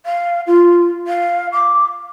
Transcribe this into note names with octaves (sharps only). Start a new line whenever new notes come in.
F5
F4
F5
D6